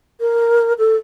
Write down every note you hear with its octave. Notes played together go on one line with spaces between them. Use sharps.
A#4
A4